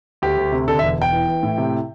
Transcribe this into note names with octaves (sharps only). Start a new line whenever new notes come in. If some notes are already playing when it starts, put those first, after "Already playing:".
D2 G4
D2
C3
D3 A4
E5
E1
E1 G5
E3
E3
A2
C3